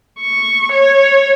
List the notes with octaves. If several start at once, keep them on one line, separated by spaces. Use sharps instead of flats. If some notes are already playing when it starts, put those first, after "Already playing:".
C#6
C#5